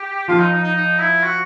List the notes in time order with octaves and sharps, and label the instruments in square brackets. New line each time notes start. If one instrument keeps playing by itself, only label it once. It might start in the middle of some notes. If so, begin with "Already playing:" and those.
Already playing: [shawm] G4
[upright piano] F3 [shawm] F4
[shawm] D#4
D#4
D#4
D#4
E4
F#4